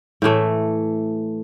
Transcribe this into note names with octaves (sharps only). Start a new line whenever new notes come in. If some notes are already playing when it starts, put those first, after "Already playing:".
A2 E3 A3